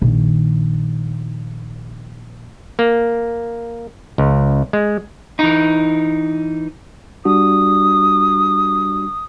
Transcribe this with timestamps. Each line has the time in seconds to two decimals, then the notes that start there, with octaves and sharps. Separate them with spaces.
0.01 A#1 D#3
2.79 A#3
4.18 C#2
4.73 G#3
5.39 E3 D#4
7.25 G3 D4 F#4 D#6